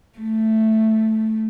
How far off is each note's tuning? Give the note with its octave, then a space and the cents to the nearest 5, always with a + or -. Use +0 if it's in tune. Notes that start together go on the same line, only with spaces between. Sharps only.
A3 +0